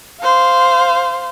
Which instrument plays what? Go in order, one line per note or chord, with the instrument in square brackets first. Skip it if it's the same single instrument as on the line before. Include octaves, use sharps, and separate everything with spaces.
[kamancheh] C5 F5